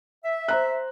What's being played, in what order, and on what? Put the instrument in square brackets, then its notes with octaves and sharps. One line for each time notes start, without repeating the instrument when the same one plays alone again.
[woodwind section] E5
[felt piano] C5 A#5 F#6